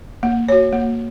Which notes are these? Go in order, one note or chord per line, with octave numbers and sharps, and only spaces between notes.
A#3
F#4 C#5
A#3